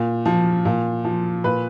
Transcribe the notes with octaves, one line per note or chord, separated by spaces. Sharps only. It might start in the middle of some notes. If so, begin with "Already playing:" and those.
Already playing: A#2
F3
A#2
F3
A#2 B4